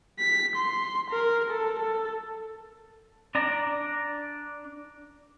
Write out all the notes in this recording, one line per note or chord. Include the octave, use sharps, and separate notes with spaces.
B6
C6
A#4
A4
A4
D4 D5 A#5